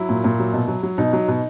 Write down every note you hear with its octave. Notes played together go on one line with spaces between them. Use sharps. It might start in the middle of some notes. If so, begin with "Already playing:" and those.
Already playing: F#3 E4
A#2
A#2
F#3
B2
F#3
F#3
B2 D#4
F#3
B2